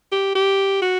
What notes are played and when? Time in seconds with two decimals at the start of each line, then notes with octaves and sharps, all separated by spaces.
0.12 G4
0.35 G4
0.82 F#4